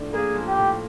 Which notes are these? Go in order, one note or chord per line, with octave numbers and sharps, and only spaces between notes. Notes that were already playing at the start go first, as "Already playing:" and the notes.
Already playing: A2 F3 D4
A#3 G#4
F3
G4
A2